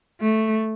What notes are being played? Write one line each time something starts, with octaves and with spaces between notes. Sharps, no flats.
A3